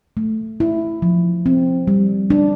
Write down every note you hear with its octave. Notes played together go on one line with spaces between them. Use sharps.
A3
E4
F3
C4
G3
D4